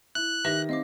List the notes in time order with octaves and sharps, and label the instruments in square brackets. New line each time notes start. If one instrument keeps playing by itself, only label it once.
[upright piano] E4 [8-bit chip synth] F#6
[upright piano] D#3 A#6 [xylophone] G4 B4 E5
[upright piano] C4 D#4 [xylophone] D#5 F5 D6